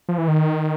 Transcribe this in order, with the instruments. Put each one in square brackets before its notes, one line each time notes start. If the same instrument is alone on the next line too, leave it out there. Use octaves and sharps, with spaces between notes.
[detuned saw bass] F3
E3
D#3